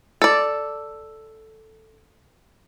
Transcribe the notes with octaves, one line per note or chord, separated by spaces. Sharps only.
A4 D5